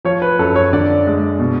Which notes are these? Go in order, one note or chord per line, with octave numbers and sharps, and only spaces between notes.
F3 C#5
B4
F#2 A4
C#5
D3 D5
G#3
B2